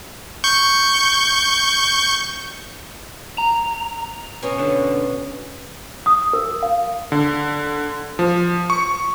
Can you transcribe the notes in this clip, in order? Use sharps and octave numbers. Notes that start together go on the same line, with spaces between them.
C#6 G6
A#5
B2 C#4
D3
D#6
A#4
F5
D3
F3
C#6